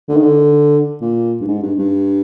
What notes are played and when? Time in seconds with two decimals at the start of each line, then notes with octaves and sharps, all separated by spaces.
0.09 D3
0.16 D#3
0.23 D3
1.01 A#2
1.41 G2
1.47 G#2
1.63 G2
1.79 G2